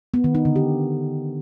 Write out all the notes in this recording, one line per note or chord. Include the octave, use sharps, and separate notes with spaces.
B3
D#3
D#4
D3
G4